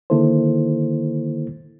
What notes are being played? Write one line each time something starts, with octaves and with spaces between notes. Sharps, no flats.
D3 D#3 A#3 E4 A4 C5